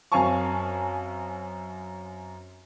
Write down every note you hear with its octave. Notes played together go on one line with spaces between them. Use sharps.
F#2 C4 F5 G#5 A5 C#6